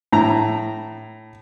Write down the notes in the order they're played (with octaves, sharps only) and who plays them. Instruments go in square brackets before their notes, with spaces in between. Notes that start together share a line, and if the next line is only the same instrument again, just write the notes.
[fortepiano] A2 A#5